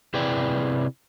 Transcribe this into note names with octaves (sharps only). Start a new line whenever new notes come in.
C3 E4 G#4 B4 D5 G5